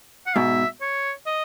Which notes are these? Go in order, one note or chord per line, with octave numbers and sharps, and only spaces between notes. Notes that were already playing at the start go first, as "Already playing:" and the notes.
F#5
G#2 B2 E5
C#5
D#5